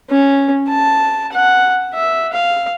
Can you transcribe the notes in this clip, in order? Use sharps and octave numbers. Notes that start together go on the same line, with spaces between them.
C#4
A5
F#5
E5
F5